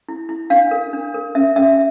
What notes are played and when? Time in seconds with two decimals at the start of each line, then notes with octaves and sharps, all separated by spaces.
0.09 E4
0.29 E4
0.50 D4 F5
0.71 A#4
0.93 D4
1.14 A#4
1.35 C#4 E5
1.56 C#4 E5